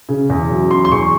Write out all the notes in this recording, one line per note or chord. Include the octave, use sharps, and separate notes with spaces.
C#3
E2
F#3
F#3 C6
C6
E2 C#6